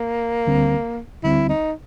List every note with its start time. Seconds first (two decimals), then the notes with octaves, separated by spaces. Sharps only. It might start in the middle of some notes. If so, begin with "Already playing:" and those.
Already playing: A#3
0.47 D2 D3 G3 C4
1.23 D2 D3 G3 C4 E4
1.49 D#4